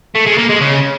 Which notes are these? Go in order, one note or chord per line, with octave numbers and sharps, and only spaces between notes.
A3
G#3
A#3
G#3
C#3